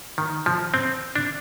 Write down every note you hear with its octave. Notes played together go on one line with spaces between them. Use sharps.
D#3
F3
C4
D4